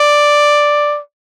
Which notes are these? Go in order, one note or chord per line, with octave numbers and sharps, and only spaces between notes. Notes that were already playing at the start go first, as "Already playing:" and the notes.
Already playing: D5